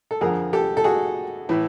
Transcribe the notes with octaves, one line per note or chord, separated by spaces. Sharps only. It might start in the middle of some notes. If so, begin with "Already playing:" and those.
A4
F2 D3 G#4 A#4
G4 A4
A4
F#4 G#4
A2 E3